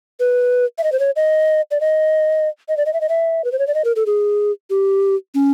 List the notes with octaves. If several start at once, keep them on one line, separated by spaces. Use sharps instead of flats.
B4
E5
D#5
C5
C#5
D#5
D5
D#5
D#5
D5
D#5
E5
D#5
E5
B4
C5
C#5
D5
D#5
A#4
A4
G#4
G4
C#4